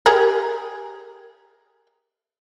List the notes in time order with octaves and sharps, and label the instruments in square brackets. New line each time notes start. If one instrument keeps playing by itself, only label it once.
[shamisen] G4 G#4 A#4